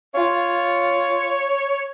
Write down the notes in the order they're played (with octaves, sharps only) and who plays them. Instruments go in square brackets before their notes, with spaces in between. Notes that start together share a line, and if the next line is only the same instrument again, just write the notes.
[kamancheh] F4 [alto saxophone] C#5